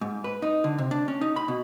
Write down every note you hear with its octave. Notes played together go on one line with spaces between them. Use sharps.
G#2
B4
D#4
D3
C3
D4
C#4
D#4
B5
B2